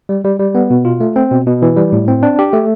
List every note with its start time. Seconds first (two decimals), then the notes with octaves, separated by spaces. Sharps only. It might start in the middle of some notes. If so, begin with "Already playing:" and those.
0.09 G3
0.24 G3
0.39 G3
0.55 B3
0.70 B2
0.85 F4
1.00 A3
1.16 C4
1.31 B2
1.47 B2
1.62 E3
1.77 G3
1.92 A2
2.08 C4
2.23 D4
2.39 G4
2.53 A3